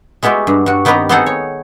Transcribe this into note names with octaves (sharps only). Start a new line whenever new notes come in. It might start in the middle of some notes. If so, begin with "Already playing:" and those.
G#3 B3 E4 F#4 G4
G2
G2 F#4
D#3 B3 C4 G4 B4 A#5
B3 C4 D#4 G#4 A4 F#5
C#5